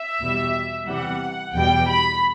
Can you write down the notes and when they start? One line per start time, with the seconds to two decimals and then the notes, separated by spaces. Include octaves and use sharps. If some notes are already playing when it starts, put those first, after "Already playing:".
Already playing: E5
0.20 E2 B2 G3
0.87 E2 C3 E3 G3 F#5
1.54 E2 B2 G3 G5
1.88 B5